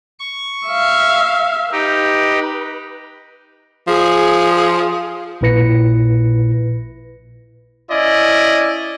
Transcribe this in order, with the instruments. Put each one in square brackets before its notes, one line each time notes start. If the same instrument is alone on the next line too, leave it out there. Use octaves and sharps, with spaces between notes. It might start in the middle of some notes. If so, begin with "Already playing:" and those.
[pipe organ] C#6
[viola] E5 F5
[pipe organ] D#4 G4 [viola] B4
[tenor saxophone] F3 [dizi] G#4
[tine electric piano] A#1 A#2 E4 B4 A#6 C#7
[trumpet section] C#4 E4 D5 D#5